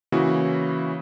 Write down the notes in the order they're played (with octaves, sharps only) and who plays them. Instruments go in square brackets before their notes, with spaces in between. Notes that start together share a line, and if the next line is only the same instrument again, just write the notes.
[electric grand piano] C#3 E3 A#3 E4 F#4 C#5